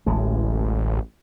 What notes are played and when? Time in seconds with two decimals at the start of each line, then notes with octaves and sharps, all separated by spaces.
0.06 D1 A1 A2 G#3